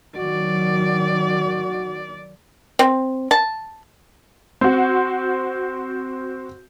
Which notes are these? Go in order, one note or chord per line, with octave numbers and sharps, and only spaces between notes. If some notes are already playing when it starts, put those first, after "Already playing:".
D#3 F#3 F#4 D5
C4
A5
C4 F#4